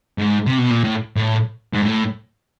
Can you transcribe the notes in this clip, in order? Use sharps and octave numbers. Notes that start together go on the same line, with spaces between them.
G#2
C3
B2
A#2
A2
A2
G#2
A2